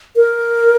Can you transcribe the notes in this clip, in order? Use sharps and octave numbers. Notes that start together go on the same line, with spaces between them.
A#4